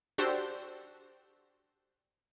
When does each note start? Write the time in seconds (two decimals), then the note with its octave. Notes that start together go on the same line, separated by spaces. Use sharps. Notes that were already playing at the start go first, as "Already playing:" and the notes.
0.18 D4 F#4 G4 A4 C5